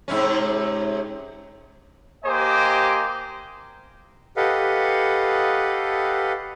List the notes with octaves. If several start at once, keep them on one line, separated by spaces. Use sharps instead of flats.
G#2 C3 C#4
A#3 G4 C5 D#5 G#5 D6
G4 A4 B4 D#5 F5 F#5